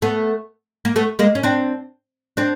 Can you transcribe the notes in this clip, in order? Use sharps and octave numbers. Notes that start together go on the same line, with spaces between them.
A3 B3
A#3
A3 B3
G#3 A#3
C#4
C4 D4
C4 D4